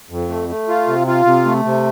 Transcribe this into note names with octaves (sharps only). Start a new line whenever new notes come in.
F2
A3
A3
F4
C3
F4
C3
A3
C3